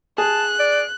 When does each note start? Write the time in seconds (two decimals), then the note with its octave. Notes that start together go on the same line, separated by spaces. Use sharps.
0.18 G#4 A5 F#6
0.59 D5